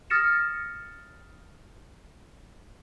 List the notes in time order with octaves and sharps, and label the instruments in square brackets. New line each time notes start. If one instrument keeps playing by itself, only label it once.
[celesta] D#6 F6 A6 A#6 C#7 E7